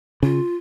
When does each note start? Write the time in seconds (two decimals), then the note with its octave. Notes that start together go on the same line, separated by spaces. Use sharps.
0.23 C#3 F4